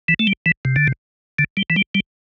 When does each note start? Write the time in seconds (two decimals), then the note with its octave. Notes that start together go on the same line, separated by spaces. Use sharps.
0.08 E3
0.19 A3
0.27 G3
0.46 E3
0.65 C3
0.76 D3
0.87 C3
1.39 D3
1.57 G3
1.70 E3
1.76 G3
1.95 G3